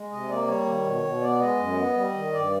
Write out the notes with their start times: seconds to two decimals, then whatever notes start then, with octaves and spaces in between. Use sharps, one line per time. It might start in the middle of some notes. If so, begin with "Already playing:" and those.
Already playing: G#3
0.11 C3 D#5
0.29 A#3 D5
0.47 G3 C#5
0.66 D#3
0.84 B2
1.03 B2
1.21 B3 D5
1.39 G#3 D#5
1.58 F#2
1.76 B3
1.95 G3
2.14 D#3
2.32 G2 D5